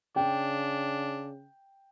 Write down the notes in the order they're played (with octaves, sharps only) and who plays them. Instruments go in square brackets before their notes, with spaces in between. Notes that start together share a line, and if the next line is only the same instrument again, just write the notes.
[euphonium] C#3 [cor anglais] D4 [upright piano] G5